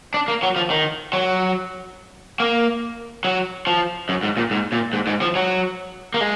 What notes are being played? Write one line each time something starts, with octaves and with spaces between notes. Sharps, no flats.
D4
A#3
F#3
F3
D#3
F#3
A#3
F#3
F3
F#2
G#2
A#2
G#2
A#2
G#2
G#2
F3
F#3
A#3
G#3